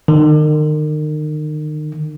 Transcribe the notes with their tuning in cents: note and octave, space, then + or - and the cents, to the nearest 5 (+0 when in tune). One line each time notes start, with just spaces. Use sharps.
D#3 -35